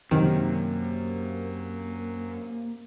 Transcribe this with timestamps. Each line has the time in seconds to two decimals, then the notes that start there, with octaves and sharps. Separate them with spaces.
0.11 F#2 C3 D#3 A#3